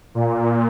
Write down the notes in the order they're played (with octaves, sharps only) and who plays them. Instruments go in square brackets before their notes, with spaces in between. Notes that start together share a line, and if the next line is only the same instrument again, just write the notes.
[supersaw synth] A#2